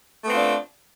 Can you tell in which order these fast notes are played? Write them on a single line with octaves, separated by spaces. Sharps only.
A3 B3 C4 F4 D4